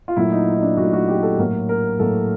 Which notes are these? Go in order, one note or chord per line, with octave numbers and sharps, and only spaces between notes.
F4
A#2 F#3 A3 E4
D#4
D#4
D4
A#2 F#3 A3 F#4
F#4
G4
A4
A2 F#3 A#3 A#4
A#4
A2 F#3 A#3 A4